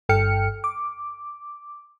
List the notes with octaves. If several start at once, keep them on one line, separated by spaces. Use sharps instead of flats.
G1 G2 A4 G5 F6 C#7
D6